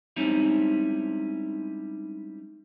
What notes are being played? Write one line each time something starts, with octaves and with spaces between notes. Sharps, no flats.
G3 G#3 C4 C#4 D#4 E4